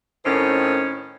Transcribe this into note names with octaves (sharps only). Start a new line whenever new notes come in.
A2 D#3 C4 C#4